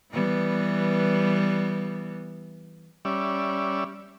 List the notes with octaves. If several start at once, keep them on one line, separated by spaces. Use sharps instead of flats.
E3 G3 B3
G3 C#4 D5 E5